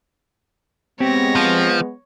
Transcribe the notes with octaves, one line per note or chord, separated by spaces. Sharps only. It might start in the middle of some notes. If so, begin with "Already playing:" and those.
G#3 B3 C4 G4 C#5 A#6
F3